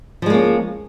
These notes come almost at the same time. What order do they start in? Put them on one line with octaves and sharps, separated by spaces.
F3 G#3 A#3 C#4